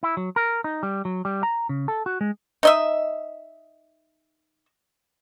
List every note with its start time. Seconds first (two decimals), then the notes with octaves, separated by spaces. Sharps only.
0.03 E4
0.17 F#3
0.36 A#4
0.64 D#4
0.83 G3
1.05 F#3
1.25 G3
1.43 A#5
1.69 C#3
1.88 A4
2.06 F#4
2.21 G#3
2.63 D#4 D#5 E5